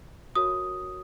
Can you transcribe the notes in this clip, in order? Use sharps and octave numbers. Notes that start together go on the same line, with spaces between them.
F#4 A#4 C#5 D#6